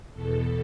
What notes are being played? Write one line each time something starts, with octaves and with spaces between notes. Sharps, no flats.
E2 B2 A4